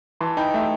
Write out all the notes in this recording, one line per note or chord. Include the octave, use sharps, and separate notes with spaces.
E3 A5 C6
D#4 G5 B5
A3 E5 G5